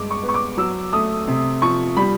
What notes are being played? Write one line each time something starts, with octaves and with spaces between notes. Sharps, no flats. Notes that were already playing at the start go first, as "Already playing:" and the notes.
Already playing: G2 G#3 D6
C#6
B3
C#6
D6
F#3 E6
A3 D#6
C3
F3 C#6
G3 B5